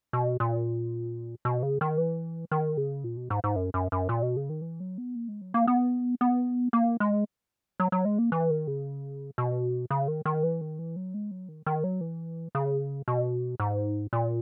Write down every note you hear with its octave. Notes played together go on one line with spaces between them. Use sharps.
B2
A#2
B2
C#3
D#3
E3
D#3
C#3
A#2
B2
G#2
G#2
F#2
F#2
F#2
A#2
B2
C#3
D#3
E3
F#3
B3
A#3
G#3
F#3
A#3
B3
B3
A#3
G#3
F#3
F#3
G#3
A#3
E3
D#3
C#3
B2
C#3
D#3
D#3
E3
D#3
E3
F#3
G#3
F#3
D#3
D#3
F#3
E3
C#3
B2
G#2
A#2